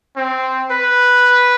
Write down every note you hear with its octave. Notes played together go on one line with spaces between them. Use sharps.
C4
B4